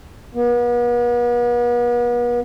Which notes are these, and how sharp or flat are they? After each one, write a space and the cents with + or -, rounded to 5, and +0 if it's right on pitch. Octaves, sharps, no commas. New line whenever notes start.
B3 -40